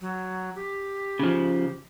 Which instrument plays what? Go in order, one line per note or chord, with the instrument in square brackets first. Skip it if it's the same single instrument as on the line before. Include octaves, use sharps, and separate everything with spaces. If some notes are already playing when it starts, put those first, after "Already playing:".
[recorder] F#3
G4
[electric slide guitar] C#3 F3